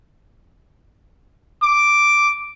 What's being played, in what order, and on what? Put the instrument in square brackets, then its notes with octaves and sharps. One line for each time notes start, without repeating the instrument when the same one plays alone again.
[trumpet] D6